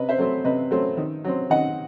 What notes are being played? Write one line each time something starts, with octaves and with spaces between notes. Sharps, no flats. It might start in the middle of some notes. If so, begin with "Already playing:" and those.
Already playing: C3 B4 D#5
C5 E5
F#3 A3 C4
C3 B4 D#5
F#3 A3 C4
D#3
F#3 C4
D#3 D#5 F#5